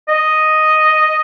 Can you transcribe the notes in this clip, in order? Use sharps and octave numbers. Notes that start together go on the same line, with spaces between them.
D#5